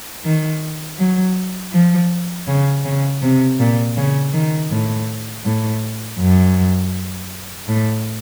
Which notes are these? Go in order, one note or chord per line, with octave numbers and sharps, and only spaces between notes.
D#3
F#3
F3
C#3
C#3
C3
A#2
C#3
D#3
A2
A2
F#2
A2